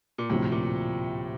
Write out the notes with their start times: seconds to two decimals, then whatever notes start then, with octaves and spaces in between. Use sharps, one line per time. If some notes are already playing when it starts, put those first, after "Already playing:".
0.18 A#2
0.30 D2 A2 C3 F3 C4
0.52 A#2